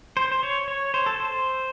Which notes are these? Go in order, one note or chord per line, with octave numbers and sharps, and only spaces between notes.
C5
C5
C#5
C#5
C5
A4
C5